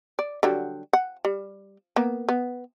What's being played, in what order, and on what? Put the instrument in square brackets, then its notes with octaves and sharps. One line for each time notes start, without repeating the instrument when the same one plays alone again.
[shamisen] D5
D3 F#3 G3
F#5
G3
A#3 B3
B3